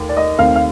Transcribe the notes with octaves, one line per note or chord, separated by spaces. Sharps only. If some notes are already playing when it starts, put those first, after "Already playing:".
Already playing: D#2 A3
D5
D#5
D#2 D#3 A3 C4 F5
F5